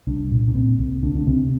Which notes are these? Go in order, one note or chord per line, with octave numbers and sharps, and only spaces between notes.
C2 D4
A#2
D4
A#2 C4
C2
D2 D4
D4
C3 C4